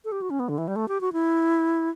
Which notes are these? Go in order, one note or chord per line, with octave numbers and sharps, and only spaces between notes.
A4
G4
F#4
C#4
B3
D3
E3
G3
A3
G4
F#4
E4